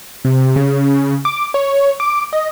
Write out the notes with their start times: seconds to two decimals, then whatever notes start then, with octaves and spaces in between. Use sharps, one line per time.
0.25 C3
0.56 C#3
1.25 D6
1.54 C#5
2.00 D6
2.33 D#5